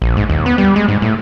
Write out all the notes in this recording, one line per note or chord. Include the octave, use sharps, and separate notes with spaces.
A#1
G#2
D#2
B3
G3
G#3
G#2
A2